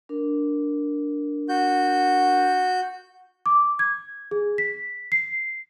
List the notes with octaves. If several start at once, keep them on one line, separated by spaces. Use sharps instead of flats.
D4 A#4
F#4 G6
D6
G#6
G#4
B6
C7